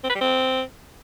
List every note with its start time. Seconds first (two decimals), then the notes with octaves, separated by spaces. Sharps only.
0.04 C4
0.09 B4
0.15 G3
0.21 C4